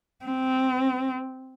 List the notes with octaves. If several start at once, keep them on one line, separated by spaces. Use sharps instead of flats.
C4